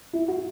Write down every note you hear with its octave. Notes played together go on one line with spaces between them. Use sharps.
E4
F#4